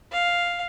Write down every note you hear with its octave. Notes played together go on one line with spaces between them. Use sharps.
F5